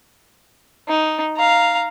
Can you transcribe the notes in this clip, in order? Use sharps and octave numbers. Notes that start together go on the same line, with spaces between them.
D#4
F5 A#5